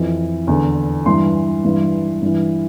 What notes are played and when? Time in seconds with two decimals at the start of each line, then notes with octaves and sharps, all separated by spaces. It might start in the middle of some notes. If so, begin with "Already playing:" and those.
Already playing: F2 E3
0.47 E2 D3
1.06 G2 E3 C6
1.65 G2 E3
2.22 G2 E3